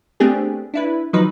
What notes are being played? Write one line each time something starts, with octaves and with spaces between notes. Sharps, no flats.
A3 B3 C4 D4 G4 G#4
D4 E4 B4
D#3 F3 F#3 D#4 B4